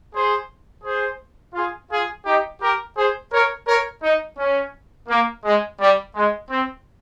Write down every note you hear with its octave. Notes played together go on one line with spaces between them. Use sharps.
G#4 C5
G#4 C5
F4 G#4
F4 G#4
D#4 G4
G4 A#4
G#4 C5
A#4 C#5
A#4 C#5
D#4
C#4
A#3
G#3
G3
G#3
C4